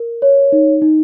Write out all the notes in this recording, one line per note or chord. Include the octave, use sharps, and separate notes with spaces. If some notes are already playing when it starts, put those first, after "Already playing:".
Already playing: A#4
C#5
D#4
D#4